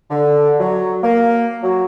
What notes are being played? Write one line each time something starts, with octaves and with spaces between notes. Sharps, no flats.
D3
F#3
A#3
F#3